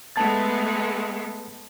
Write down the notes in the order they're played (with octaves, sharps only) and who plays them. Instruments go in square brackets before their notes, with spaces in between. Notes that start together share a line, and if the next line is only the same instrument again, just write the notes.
[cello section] G#3 A3 B3 [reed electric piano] A5 G#6 A6